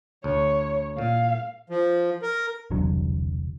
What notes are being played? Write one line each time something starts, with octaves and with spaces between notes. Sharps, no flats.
D2 C#5
A#2 F5
F3
A#4
E1 C2 D3 F#3